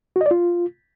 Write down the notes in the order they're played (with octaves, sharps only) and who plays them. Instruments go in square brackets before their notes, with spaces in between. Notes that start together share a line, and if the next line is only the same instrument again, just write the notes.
[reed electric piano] F#4
D#5
D5
F4